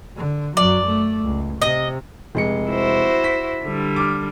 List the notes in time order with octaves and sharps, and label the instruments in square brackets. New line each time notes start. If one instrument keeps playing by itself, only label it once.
[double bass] D3
[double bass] F#2 F#3 [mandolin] D5
[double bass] A3
C#2
[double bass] C3 [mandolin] D#5
[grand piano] F1 G#3 C#7
[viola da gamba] E4 F#4 C5
[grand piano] B6
[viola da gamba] D3 G3
[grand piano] D6 F6